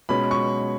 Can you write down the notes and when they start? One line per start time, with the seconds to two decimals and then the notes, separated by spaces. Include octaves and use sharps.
0.09 B2 G#3 C#4 B5
0.31 C#6